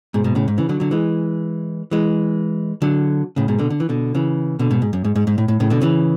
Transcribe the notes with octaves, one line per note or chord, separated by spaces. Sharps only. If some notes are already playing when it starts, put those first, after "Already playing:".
G#2 B2
G#2 B2
A2 C#3
G#2
C#3 E3
D3 F#3
D3 F#3
E3 G#3
E3 G#3
D3 F#3
A2 C#3
G#2 B2
B2 D3
D3
E3
B2 D3
C#3 E3
B2 D3
G#2 B2
G#2
F#2
G#2
G#2
G#2
A2
A2
A2 C#3
B2 D3
C#3 E3